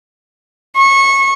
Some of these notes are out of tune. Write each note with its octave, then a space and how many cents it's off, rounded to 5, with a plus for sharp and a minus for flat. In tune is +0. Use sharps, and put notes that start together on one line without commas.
C#6 -20